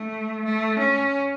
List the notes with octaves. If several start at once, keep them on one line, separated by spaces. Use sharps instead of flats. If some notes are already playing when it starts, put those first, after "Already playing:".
Already playing: A3
A3
C#4